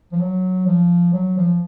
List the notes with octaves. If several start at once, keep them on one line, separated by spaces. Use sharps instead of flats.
F3
F#3
F3
F#3
F3